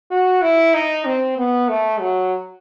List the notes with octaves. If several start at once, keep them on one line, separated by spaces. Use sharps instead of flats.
F#4
E4
D#4
C4
B3
A3
F#3